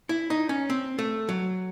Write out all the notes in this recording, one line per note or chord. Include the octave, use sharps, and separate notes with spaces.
E4
D#4
C#4
C4
A3
F#3